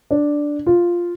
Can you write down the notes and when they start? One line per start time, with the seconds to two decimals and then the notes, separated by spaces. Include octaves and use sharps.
0.11 D4
0.66 F4